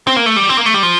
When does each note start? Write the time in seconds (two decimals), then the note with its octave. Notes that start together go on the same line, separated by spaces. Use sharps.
0.07 C4
0.16 A#3
0.26 A3
0.36 G3
0.49 C4
0.57 A#3
0.66 A3
0.74 G3
0.83 F3